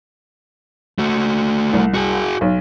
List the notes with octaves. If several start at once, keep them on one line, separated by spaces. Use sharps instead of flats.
A3 F#4
C2
F#4 G#4
B1